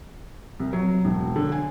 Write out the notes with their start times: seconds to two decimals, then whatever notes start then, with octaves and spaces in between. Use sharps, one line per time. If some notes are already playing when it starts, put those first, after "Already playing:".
0.60 C2
0.73 F#3
1.05 E1
1.36 D3
1.52 G#5